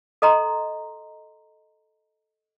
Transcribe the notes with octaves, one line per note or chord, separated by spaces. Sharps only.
A4 D#5 A#5 C6